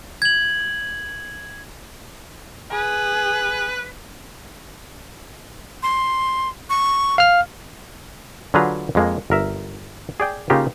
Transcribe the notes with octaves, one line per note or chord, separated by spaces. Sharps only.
G#6 F#7
G#4 B4
C6
C#6
F5 F6
D3 F#3 F4 G#4 B4 A#5
F2 G#3 A#3
G1 A#4 E5
G#4 D5 G5
C#3 A#3 D#4 F4 G4